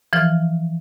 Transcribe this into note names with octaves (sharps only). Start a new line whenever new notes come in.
E3 F3 F6